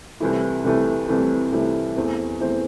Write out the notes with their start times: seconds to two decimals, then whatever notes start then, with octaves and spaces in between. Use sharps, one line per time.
0.20 C2 C3 E3 A3 E4
0.65 C2 C3 E3 A3 E4
1.08 C2 C3 E3 A3 E4
1.52 C2 C3 E3 A3 E4
1.97 E2 E3 A3 C4
2.40 E2 E3 A3 C4